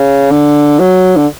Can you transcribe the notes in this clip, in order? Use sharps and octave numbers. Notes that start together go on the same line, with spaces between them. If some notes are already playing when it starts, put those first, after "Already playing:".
Already playing: C#3
D3
F#3
D3